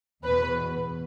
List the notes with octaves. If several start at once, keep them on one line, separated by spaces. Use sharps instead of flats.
E2 B2 B4